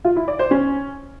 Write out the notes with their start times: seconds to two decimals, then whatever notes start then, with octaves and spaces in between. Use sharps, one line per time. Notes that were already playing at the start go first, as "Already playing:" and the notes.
0.05 F4
0.16 E4
0.28 D5
0.39 C5
0.51 C#4